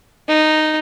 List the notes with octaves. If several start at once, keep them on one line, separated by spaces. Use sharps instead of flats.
D#4